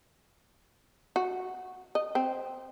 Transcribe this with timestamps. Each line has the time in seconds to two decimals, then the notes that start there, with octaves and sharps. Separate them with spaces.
1.16 F#4
1.95 D#5
2.15 C4